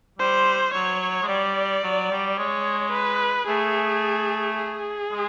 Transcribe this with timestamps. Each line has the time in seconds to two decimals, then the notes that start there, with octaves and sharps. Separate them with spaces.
0.19 G3 C5
0.74 F#3 C#5
1.22 G#3
1.29 G3 D5
1.83 F#3
2.11 G3
2.38 G#3 C#5
2.93 B4
3.47 A3 G#4
4.57 G#4
5.12 G#3